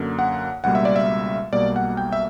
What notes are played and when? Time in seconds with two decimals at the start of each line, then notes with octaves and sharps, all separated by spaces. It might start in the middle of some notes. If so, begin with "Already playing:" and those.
Already playing: F#2 D3 F#3 A#3
0.19 F#5
0.64 C#2 B2 G3 A#3 F#5
0.75 E5
0.85 D5
0.96 E5
1.53 B1 B2 G3 A#3 D5
1.76 F#5
1.97 G5
2.12 E5